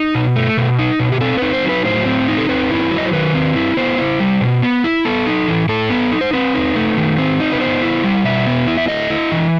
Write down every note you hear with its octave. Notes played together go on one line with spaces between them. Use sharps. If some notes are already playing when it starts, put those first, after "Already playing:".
Already playing: D#4
B2
A3
B2
D#4
B2
G4
C4 A4
D#4 B4
C5
F#3
B4
A2 C5
C4
D#4
A4
C4 B4
E4
F#3
D#5
C5
D#3 B4
C4
E4
B3 C5
E4
G3
B2
B3
E4
B3 A4
D#4
E3
A2 A4
B3
D#4
C5
C4 B4
D#4
A3
D#3
C4
D#4
B4
B3 C5
E4
G3
B2 E5
B3
E4
E5
A3 D#5
E4
E3